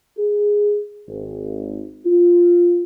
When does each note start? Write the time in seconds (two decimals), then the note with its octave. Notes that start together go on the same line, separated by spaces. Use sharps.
0.17 G#4
1.08 G#1
2.06 F4